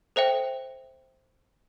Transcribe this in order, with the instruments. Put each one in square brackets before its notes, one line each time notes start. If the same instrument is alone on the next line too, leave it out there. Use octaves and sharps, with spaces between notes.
[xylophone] A4 C5 E5 G5